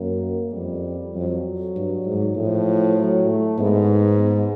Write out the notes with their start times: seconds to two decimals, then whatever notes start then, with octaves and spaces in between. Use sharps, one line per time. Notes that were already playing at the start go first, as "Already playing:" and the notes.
Already playing: F#2 A#3
0.53 F2 G3
1.15 F2 F#3
1.76 G2
2.06 G#2
2.36 A2 F3
2.98 F#3
3.28 A3
3.58 G#2 B3
4.19 B3